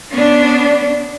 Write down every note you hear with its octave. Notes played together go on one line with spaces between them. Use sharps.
B3 C#4 D4